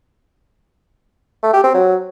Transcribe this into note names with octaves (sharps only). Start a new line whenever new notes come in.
A3
G4
C4
F#3